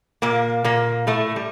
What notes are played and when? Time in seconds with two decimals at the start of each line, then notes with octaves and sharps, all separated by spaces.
0.22 A#2 A#3
0.64 A#2 A#3
1.07 A2 A3
1.36 G3